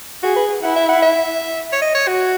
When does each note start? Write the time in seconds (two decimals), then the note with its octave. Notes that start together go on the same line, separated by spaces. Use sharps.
0.23 F#4 G#4
0.36 B4
0.63 E4 F#5
0.76 E5
0.89 F#5
1.02 E5
1.73 C#5
1.82 D#5
1.95 C#5
2.07 F#4